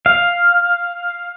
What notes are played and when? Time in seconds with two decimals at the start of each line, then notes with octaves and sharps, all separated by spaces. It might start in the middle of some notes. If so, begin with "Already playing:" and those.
0.06 F5